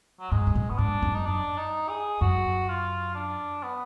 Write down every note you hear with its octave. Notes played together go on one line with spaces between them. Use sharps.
F#3
G#2 G#3
G#2
A#2
B3
G#2 D4
F#2
D#4
D4
D#4
G#4
F#2 F#4
F4
D4
B3